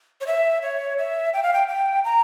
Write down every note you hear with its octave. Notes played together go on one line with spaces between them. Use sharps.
C#5
E5
C#5
E5
G5
F5
G5
G5
A#5